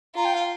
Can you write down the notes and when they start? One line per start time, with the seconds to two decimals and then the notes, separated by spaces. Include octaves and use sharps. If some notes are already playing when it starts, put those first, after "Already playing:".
0.16 F4 A#5
0.25 G5
0.35 F5